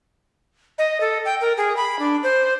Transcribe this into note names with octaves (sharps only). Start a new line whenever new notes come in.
D#5
A4
G5
A#4
G#4
B5
D4
C5